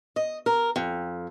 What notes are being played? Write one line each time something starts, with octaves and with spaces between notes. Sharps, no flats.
D#5
A#4
F2